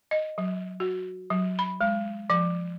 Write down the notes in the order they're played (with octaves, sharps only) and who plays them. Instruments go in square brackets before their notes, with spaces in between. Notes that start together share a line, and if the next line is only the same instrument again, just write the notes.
[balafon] D#5
F#3
F#4
F#3
B5
G#3
F3